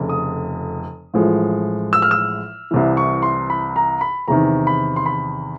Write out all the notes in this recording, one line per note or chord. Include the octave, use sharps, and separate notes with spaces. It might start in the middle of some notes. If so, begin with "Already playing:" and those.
Already playing: F1 F2 C#3
D#6
A1 A2 F3 G#3
E6
F6
E6
C2 C3 E3
C#6
C6
B5
A#5
B5
E2 C3 D#3 A#5
B5
C6
B5